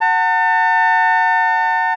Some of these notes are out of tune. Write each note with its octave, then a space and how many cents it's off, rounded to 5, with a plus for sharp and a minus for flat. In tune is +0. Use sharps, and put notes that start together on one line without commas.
F#5 +0 A5 +40